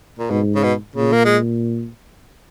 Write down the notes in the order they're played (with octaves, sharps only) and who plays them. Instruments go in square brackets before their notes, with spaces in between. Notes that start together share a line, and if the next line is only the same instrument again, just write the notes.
[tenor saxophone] A#2
[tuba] G#2 [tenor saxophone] B2
[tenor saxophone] C#3
B2
[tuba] A#2 [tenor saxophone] C#3
[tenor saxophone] A#3
G#3